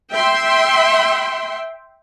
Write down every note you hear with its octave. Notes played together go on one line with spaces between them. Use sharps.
E5 G5 C6